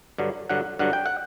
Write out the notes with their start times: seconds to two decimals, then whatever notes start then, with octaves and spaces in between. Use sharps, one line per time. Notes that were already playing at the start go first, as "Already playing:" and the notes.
0.18 G2 D3 F#3
0.49 G2 D3 F#3 F#5
0.79 G2 D3 F#3 F#5
0.93 G5
1.06 F#5